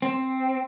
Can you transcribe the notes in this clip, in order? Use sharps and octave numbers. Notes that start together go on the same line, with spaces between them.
C4